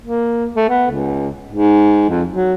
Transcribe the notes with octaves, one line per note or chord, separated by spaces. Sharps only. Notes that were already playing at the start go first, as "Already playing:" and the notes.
A#3
A3
B3
C#2
G#2
F2
F#3